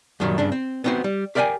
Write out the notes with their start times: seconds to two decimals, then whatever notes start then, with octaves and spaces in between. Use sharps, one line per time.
0.20 F#2 A#2 D#3 F#3 G3
0.38 G2 C#3 D4
0.52 C4
0.84 B3 C4 D#4 F#4 C5
1.04 G3
1.35 G4 A#4 D5 E5 G5 G#5